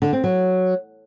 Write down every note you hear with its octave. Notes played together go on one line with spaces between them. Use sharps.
D3
C4
F#3